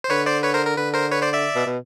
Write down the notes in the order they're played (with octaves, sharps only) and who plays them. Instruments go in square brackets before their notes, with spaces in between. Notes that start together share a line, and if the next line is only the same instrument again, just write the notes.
[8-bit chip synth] C5
[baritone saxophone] D3 [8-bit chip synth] B4 C#5
[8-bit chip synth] C5 D5
B4 C#5
A#4 C5
A#4
[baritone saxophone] D3 [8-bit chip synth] B4
[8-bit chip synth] A#4 C5
B4 C#5
C5 D5
D5 E5
[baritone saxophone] B2
B2